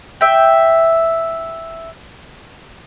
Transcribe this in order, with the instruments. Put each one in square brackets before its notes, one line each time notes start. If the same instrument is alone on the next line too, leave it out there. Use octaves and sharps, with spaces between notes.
[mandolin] E5 G5